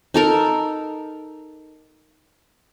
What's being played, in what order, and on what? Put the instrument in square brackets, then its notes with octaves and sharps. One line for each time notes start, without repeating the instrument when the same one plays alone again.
[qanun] D#4 A4 A#4